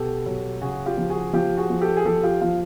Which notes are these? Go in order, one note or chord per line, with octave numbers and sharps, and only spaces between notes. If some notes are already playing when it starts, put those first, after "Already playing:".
Already playing: B2 G4 A4
F#3
C#3 F#4 G#4
F4 G4
F3
F#4 G#4
F3 F4 G4
F#4 G#4
F3
G4 A4
G#4
F3 G4 A4
F4 G4
F3 F4